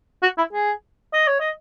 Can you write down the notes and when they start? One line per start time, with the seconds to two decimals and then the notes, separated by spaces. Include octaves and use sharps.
0.23 F#4
0.38 E4
0.53 G#4
1.13 D#5
1.28 C#5
1.40 D#5